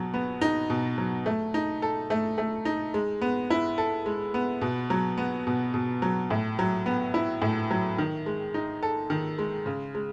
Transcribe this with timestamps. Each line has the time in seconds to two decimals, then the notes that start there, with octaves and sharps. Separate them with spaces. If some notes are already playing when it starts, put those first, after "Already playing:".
Already playing: B2 F#3
0.14 B3
0.41 D#4
0.70 B2
0.98 F#3
1.26 A3
1.54 D#4
1.82 A4
2.10 A3
2.38 A3
2.65 D#4
2.94 G#3
3.21 B3
3.50 E4
3.78 A4
4.06 G#3
4.34 B3
4.61 B2
4.90 F#3
5.18 B3
5.47 B2
5.74 B2
6.02 F#3
6.31 A2
6.59 F#3
6.86 B3
7.14 E4
7.42 A2
7.71 F#3
7.98 D#3
8.26 G#3
8.54 D#4
8.83 A4
9.10 D#3
9.39 G#3
9.66 C#3
9.95 G#3